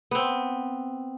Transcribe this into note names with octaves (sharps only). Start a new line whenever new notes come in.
B3 C4